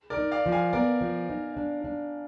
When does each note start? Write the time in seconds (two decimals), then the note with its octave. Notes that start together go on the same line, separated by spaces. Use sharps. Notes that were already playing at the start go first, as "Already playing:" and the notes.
0.10 A#4 D5
0.17 D#4
0.31 D5 F5
0.46 F3
0.52 F5 G#5
0.73 B3 A#4 D5
1.01 F3
1.30 D#4
1.57 D4
1.84 D4